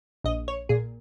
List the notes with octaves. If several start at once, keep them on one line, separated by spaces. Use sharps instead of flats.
A#1 D#5
C#5
A#2 G#4